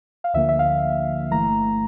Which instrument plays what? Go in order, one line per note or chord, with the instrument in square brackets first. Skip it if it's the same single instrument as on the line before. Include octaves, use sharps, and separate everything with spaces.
[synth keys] F5
D2 D3 F3 A#3 E5
E5
F5
G1 G2 E3 A3 A#5